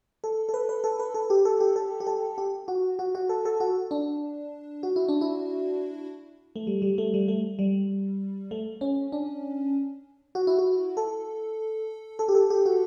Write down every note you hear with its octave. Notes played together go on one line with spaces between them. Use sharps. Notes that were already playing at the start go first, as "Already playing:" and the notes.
A4
A4
B4
B4
A4
B4
A4
G4
A4
G4
A4
G4
A4
G4
F#4
F#4
F#4
A4
A4
F#4
D4
F#4
E4
D4
E4
A3
G3
G3
A3
G3
A3
G3
A3
C#4
D4
F#4
E4
F#4
A4
A4
G4
A4
G4
F#4